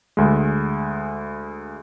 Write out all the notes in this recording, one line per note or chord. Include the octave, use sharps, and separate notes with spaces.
D2 G#3